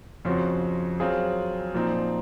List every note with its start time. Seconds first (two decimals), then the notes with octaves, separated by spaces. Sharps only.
0.25 F2 C#3 F3 C4 F#4
1.00 F#3 C4 F4 G#4
1.74 A#2 F3 C4 D#4